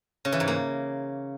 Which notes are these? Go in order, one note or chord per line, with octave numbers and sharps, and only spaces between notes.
C#3
E3
G#2
A#3